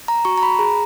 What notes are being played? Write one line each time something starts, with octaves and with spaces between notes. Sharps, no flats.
A#5
F#4 C#6
A#5
B5
G#4 A#5